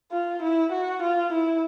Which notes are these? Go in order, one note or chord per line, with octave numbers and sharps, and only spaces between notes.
F4
E4
F#4
F4
E4